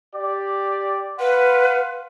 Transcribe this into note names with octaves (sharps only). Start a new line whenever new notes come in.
G4 D5
B4 F5 F#5 C6